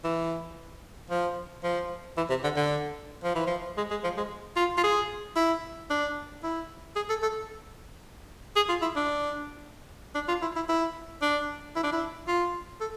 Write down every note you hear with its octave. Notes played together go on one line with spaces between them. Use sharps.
E3
F3
F3
E3
C3
D3
D3
F3
E3
F3
G#3
G#3
F3
G#3
F4
F4
G#4
E4
D4
E4
G#4
A4
A4
G#4
F4
E4
D4
D4
F4
E4
E4
E4
D4
E4
D4
E4
F4
A4